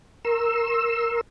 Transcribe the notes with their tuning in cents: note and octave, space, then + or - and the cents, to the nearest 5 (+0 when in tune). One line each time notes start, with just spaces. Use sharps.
A#4 +0 C6 +40 E6 +0